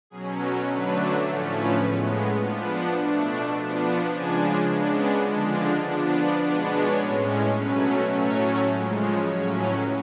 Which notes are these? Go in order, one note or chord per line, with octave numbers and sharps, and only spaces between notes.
B2 F#3 C#4 G#4
A4
D3 F#3 A3 D4 B4
A2 F3 A3 C#4
B4
A2 G#3 B3
C#5
F3 B3 D4 F5
F#5
B2 A3 D4
F3 B3 D4 A5
F#5
C#3 F3 G#3 D4 G#5
C#3 G#3 B3 D4
G#5
D3 F3 G#3 D4 B5
A5
F3 B3 D4 F#5
D5
B2 G#3 B3 D4
C#5
A2 G#3 C#4
B2 F#3 A3 C#4 B4
A2 F#3 A3 C#4 C#5
C#3 F3 G#3
C#5
A2 F#3 C#4 C#5
B4